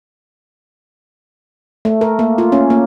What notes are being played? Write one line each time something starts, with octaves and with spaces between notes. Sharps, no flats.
A3
A#4
A#3
F4
C#4
A#3